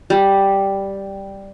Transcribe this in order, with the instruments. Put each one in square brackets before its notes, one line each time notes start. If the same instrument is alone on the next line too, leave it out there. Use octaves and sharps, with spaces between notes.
[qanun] G3